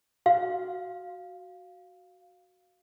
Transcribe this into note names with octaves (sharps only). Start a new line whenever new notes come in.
F#4 F5